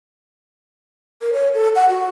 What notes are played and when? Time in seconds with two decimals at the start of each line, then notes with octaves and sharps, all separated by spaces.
1.21 A#4
1.33 C#5
1.54 A4
1.75 F#5
1.89 F#4